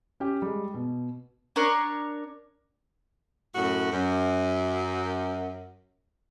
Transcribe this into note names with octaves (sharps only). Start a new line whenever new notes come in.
C#4 G4
G3 G#3
B2
D4 A#4 C#5
F#2 A2 F#4
F#2